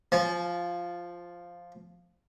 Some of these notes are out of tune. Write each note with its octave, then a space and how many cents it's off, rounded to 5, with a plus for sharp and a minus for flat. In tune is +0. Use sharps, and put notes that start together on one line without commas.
F3 +0 G#5 +45